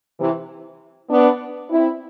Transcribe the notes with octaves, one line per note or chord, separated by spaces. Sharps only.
C3 E3
B3 D4
C4 E4